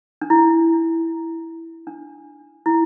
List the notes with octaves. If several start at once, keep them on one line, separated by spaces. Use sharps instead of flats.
D4
E4
D4
E4